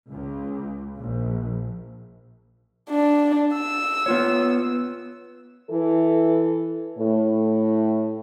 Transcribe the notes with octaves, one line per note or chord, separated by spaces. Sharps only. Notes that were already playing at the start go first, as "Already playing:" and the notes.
C#2
A#1
D4
E6
B3 F4 C#5
E3 A4
A2